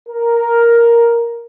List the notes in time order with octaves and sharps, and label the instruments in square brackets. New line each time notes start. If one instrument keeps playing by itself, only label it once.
[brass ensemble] A#4